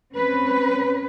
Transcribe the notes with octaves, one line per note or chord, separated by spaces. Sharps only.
C4 C#4 B4